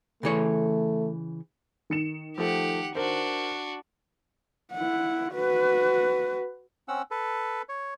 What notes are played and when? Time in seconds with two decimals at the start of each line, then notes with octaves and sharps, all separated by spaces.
0.23 C#3 E3 A3 C#5
1.90 D#3 C#7 E7
2.38 F3 A3 G4 F#5
2.95 D4 F#4 A#4 C5
4.73 E4 F#5
5.35 F#4 B4
6.88 C4 C#4 F#5 E6
7.11 A4 B4
7.69 C#5